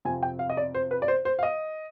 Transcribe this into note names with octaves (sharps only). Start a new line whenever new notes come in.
F2 C3 F3 C4 G#5
G5
F5
D#5
D5
C5
B4
D5
C5
C5
F5
D#5